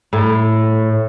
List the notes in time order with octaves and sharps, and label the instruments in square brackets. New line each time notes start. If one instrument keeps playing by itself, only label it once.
[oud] A2